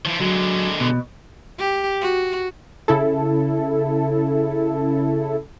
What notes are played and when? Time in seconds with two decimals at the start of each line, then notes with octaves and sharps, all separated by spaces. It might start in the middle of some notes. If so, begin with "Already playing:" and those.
0.05 E3 F3
0.20 D3 F#3 G#3
0.80 B2
1.59 G4
2.01 F#4
2.88 C#3 E4 A4